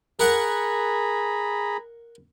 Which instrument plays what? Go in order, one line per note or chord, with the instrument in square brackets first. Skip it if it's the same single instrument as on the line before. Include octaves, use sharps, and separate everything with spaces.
[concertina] G#4 A#5 B5 [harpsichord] A#4 F#5 C#6